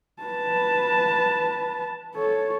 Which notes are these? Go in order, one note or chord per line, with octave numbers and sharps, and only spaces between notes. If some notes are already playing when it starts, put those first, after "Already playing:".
B4 A5
A4 C#5